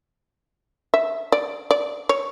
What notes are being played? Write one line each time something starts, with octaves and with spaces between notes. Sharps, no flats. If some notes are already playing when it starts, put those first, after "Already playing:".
E5
D5
D5
C#5